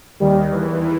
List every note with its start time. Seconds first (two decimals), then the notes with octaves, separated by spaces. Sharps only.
0.20 D#2 D#3 G3
0.51 E2 E3